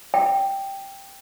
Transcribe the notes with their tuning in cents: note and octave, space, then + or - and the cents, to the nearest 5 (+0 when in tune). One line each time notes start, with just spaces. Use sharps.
G5 +5